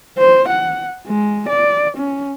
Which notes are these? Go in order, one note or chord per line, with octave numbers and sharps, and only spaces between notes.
C5
F#5
G#3
D5
C#4